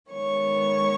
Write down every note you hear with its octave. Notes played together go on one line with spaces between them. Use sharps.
D#3 G#3 B3 C#5 C#6